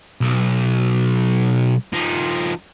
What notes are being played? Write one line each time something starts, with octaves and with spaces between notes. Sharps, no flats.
B1
F3 D#4